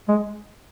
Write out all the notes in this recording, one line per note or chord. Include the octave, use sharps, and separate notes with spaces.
G#3